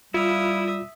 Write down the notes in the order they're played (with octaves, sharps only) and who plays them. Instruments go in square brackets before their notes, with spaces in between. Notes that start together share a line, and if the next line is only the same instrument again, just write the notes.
[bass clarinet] G3 [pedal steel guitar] E4 F5 [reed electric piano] F4 [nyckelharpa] E5 D#6